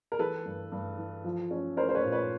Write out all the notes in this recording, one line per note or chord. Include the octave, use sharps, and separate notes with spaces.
A#4
E3 A4 B4
G2
G2
E3
F3
C#4
C#4 A#4 C5
C5
B4 C#5
A#2
B4 C#5